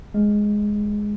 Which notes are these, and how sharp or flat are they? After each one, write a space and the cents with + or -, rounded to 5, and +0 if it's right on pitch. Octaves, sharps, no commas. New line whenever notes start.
G#3 +0